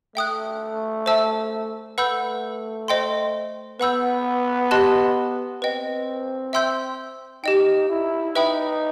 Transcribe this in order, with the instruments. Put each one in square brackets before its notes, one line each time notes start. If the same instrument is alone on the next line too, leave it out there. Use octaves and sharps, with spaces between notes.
[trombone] A3 [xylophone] E5 G5 D#6 F#6
[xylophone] C5 E5 A5 E6
[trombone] A3 [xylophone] B4 F#5 B5 E6 G6
[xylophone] C5 D#5 G5 C6
[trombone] B3 [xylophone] B4 F#5 B5 E6 G6
[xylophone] G4 D#5 A5 C6 F#6
[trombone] C4 [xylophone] B4 D#5 G5
[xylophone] E5 G5 C6 E6 G6
[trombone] D#4 [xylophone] G4 D#5 G5
[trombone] E4
[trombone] D#4 [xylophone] B4 E5 G5 B5 D#6